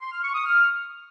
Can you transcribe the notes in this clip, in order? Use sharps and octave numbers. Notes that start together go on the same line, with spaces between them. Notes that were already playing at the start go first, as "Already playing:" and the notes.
C6
F6
C#6
D#6
F6